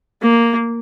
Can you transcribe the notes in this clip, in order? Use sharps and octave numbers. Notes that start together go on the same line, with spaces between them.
A#3